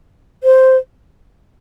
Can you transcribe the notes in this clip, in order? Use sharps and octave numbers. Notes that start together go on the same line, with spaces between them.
C5